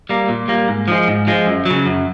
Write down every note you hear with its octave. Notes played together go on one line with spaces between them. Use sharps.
G3 A#3
A#2
G3 A#3
G#2
F3 G#3
G#2
F3 G#3
F#2
C#3 F#3
F#2